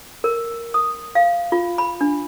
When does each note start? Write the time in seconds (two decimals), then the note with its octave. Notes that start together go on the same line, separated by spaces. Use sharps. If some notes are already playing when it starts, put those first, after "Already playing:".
0.24 A#4
0.74 D#6
1.15 F5
1.52 F4
1.78 B5
2.01 D4